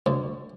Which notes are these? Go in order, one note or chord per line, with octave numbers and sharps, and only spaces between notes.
D2